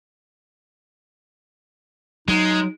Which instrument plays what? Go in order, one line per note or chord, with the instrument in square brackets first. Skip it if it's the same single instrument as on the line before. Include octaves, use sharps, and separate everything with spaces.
[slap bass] F#3 [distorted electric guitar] G#3 [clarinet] D#4